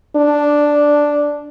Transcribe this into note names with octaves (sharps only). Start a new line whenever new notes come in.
D4